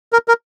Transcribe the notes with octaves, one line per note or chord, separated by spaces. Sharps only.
A#4
A#4